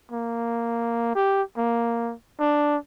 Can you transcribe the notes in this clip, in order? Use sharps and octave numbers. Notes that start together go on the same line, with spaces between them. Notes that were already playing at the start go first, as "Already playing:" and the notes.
A#3
G4
A#3
D4